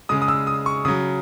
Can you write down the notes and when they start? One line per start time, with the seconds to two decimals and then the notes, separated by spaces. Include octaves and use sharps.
0.09 C#3 G#3 D#6
0.22 D#6
0.28 E6
0.47 D#6
0.66 C#6
0.85 C#3 F#3 D#6